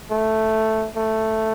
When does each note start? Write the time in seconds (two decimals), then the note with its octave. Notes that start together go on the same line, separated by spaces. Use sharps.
0.10 A3
0.96 A3